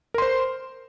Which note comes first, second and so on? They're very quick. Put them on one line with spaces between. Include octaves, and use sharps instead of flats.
A#4 C6 C5